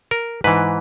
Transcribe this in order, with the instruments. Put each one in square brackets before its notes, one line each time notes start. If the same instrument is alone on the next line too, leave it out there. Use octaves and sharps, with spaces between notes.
[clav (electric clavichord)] A#4
G#2 E3 B4